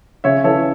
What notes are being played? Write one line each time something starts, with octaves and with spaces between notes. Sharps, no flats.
C#3 C#5 E5
E3 A4 C#5